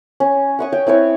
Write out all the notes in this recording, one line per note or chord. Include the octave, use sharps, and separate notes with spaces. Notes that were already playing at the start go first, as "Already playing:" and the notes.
C#4
F#5 C#6 D#6
C#5 G5
C4 E4 B4 C#5